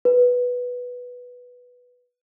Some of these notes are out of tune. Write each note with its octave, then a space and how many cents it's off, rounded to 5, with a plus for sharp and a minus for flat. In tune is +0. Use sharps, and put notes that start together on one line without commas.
B4 -5